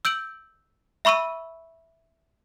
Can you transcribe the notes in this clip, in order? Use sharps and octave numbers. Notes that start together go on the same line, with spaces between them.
E6 G6 D7 F#7
E5 B5 C#6 E6 D#7